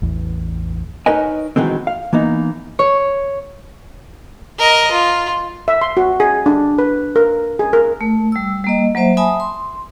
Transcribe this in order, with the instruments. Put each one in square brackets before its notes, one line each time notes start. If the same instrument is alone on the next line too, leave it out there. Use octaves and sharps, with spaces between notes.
[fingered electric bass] A1 E2
[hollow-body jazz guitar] D#4 A#4 B4 C#5 D#5 G#5
B2 D#3 E3 G#3 C4
F5
E3 A#3 B3 D#4
[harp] C#5
[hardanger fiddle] A#4 D#5
F4
[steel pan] E5
C6
F#4
G#4
D4
B4
A#4
G#4
A#4
[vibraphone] A3
G3 E6
G3 A#3 D#5
F#3 A#3 C5 E5
E5 G#5 A5 B5 D#6
C6